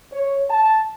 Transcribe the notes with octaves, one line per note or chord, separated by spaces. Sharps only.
C#5
A5